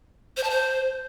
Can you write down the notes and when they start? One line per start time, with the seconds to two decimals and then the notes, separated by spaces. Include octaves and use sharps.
0.37 C5
0.43 A5
0.50 C5